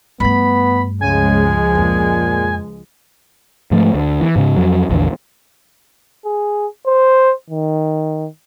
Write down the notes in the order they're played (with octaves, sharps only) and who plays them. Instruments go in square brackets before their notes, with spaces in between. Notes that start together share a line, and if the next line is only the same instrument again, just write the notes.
[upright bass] G2 A3 [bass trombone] B3 [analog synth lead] B5
[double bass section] C#2 F3 G#3 [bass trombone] C#3 [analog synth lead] G#5
[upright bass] F2 [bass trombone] A#2
[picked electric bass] G#2 F3 A3
D2
E3
G#2 C#3
F2 F#3
A#1 E2 D3
[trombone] G#4
C5
D#3